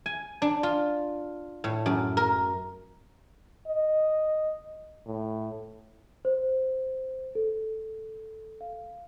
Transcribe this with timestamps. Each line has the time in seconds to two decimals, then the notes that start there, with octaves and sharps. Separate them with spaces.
0.06 G#5
0.42 D4
0.63 F4
1.64 A2
1.86 F#2
2.17 A#4
3.67 D#5
5.06 A2
6.25 C5
7.35 A4
8.61 F5